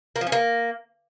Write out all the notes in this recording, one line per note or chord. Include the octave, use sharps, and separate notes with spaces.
A#3
F3
C#4
A#3